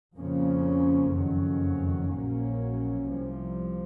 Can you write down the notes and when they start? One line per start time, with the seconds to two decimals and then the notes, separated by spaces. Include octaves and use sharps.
0.16 F2 C#3 F3 A#3 C#4
1.12 F#1 F2 D#3 F#3 C#4
2.09 A#1 A#2 F#3 A#3 C#4
3.05 C2 C3 F3